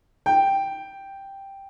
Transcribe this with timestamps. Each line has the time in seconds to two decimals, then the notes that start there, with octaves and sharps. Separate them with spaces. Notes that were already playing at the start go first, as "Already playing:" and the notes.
0.26 G5